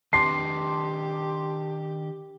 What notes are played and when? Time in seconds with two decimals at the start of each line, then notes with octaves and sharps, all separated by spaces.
0.13 D#3 D4 G4 B4 A5 C6 D6 C7